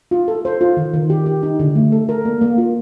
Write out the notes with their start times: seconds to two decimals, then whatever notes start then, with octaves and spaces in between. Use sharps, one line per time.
0.11 F4
0.28 A4
0.45 C5
0.61 F4
0.77 D#3
0.93 D#3
1.10 G4
1.26 G4
1.43 D#4
1.59 D3
1.75 A3
1.92 A4
2.09 A#4
2.25 A#3
2.41 A#3
2.58 F4